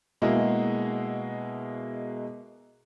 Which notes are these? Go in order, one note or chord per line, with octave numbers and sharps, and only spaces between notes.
B2 G#3 A#3 E4 F#4 G#4